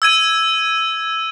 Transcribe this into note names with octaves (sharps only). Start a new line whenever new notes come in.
E6 G#6 D#7